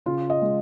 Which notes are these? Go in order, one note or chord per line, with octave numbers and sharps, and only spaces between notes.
C#3 F4
D#5
G#3